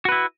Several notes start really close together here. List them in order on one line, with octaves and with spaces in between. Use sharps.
F#4 B4 E4